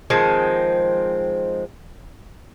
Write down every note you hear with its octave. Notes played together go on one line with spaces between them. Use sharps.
D#3 F3 G#3 C4